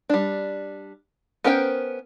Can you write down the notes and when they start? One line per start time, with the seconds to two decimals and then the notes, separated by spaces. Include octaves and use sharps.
0.10 G3 D4
1.44 B3 C#4 A#4 C5 G5